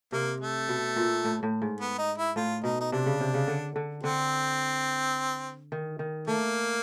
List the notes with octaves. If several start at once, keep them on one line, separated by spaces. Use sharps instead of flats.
C3 A#3
A3
B2
A#2
A2
A2
G#2
B3
D#4
E4
A2 F4
B2 D#4
D#4
C3 D4
C#3
C3
C#3
D3
D3
D3 C4
D#3
D#3
A3 A#3